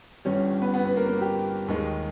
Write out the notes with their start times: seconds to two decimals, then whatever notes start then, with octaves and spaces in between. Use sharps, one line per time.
0.25 G1 G2 G3 C#4 C#5
0.61 B3 B4
0.73 B3 B4
0.84 B3 B4
0.96 A#3 A#4
1.08 A#3 A#4
1.21 G4
1.68 D#2 D#3 G#3